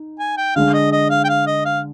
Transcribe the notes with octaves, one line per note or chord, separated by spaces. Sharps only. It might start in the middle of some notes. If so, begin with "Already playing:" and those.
Already playing: D#4
G#5
G5
D3 G#3 D4 F5
D#5
D#5
F5
G5
F5
D#5
F5